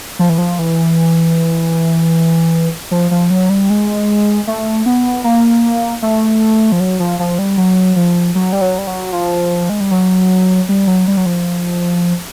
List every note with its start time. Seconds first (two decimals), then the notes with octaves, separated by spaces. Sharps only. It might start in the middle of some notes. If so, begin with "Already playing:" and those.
0.19 F3
0.29 E3
0.38 F3
0.59 E3
2.91 F3
3.11 F3
3.30 F#3
3.50 G3
3.70 G#3
4.47 A3
4.86 B3
5.24 A#3
6.02 A3
6.72 F3
6.80 F#3
7.00 F3
7.19 F3
7.39 G3
7.57 F#3
7.96 F3
8.35 F#3
8.53 G3
8.61 F#3
8.78 G3
8.87 F#3
9.12 F3
9.69 G#3
9.80 G3
9.91 F#3
10.69 G3
10.87 F#3
11.08 G3
11.17 F#3
11.26 F3